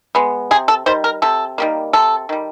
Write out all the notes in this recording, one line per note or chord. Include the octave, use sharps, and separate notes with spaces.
G#3 B3
C3 G#4
A4
D#3 G3 C5
A#4
C3 A4
D#3 G3 A#3
C3 A4
D#3 G3